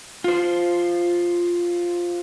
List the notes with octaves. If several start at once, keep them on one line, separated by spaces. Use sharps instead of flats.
F4 C5